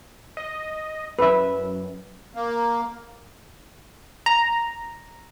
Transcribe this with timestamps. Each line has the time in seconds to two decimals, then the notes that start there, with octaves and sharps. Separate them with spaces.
0.37 D#5
1.19 F#2 B4 E5
2.35 A#3
4.26 A#5